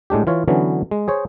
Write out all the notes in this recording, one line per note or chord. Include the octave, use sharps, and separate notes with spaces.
A2 G#3 D4 G4
E3 F4 C#5
D3 E3 F#3 B3 C#4
G#3
G#4 C5 C#5